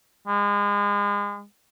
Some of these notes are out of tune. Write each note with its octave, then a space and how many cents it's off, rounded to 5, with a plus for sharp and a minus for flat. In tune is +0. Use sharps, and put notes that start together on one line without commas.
G#3 -35